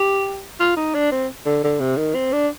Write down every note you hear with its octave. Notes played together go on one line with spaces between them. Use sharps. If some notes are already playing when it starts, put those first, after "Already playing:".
Already playing: G4
F4
D#4
D4
C4
D3
D3
C3
D#3
C4
D4